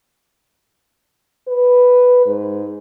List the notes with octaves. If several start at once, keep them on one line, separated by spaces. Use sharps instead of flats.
B4
G#2